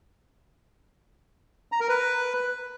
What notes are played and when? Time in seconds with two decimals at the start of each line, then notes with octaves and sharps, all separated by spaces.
1.72 A#5
1.80 A#4
1.89 B4